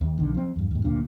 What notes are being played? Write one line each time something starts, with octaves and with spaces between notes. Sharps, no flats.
D#2
B1 D3 D#3
F3 C4
E2 G2
D#2 G#2
F#1 D2 A#2 D4